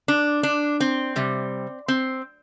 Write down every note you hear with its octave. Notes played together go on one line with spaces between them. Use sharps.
D4
D4
C4
C3 G3
C4